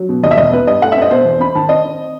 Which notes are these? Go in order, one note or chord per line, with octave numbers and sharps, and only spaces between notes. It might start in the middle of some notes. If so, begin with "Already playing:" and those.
Already playing: F#3
B2
D#2 D#5
E5
E1 D#5
B3 B4
G2 D#5
A3 F#5
E5
C4 D#5
B2 C5
E2
C4 B5
D#3 A5
C4 D#5
C4